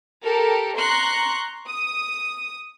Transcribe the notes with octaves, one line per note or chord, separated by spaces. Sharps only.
G4 A4 A#4
A#5 C6 C#6 F#6
D#6